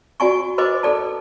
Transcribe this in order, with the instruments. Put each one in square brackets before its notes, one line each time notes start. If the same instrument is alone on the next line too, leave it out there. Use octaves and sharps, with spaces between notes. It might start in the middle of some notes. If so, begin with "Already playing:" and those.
[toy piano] F#4 D5 G#5 C#6
F#4 B4 C5 D#5 D6
A4 D5 A5